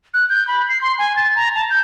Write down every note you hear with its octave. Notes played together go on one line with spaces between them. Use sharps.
F#6
G6
B5
C7
C6
G#5
A6
A#5
A5
G6